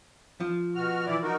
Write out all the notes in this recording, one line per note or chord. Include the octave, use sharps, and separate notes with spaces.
F3
B2 F#4 F6
E3 E4 D5
D#4 F#4 A#4